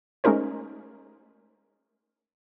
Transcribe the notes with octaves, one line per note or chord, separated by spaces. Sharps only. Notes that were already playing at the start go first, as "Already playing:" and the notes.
G#3 A3 C#4 D#4 A#4 C5